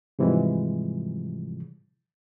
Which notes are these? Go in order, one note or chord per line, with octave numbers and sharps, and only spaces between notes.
G#2 C3 E3 F3 G3 G#3